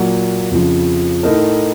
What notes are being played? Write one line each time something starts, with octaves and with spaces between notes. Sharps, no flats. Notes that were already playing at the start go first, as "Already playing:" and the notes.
Already playing: A#2 F#3 A#3
F2 C#3 F3
A2 A3 D#4 A#4